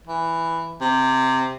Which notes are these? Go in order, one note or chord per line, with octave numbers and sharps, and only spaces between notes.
E3
C3